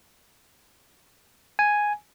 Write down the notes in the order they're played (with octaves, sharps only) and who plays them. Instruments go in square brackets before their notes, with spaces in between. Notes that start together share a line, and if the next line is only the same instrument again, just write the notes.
[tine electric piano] G#5